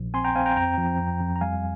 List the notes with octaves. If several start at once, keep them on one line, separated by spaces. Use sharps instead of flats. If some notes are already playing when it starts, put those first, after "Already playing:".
Already playing: A#1
C4 G#5 C6
G5 A#5
C4 F5 G#5
G5 A#5
F2 G5 A#5
F3
F2
F2
A#5
G3 F5 G#5